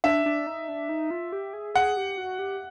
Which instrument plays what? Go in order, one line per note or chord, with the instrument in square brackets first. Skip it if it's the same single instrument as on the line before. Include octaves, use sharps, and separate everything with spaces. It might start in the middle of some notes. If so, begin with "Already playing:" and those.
[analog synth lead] D4 [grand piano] E5
[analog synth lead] D4
D#4
D4
D#4
F4
G4
G#4
[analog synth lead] G#4 [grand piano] F#5
[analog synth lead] G4
F#4
G4